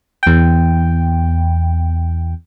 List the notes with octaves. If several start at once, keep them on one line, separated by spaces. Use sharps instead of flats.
E2 G5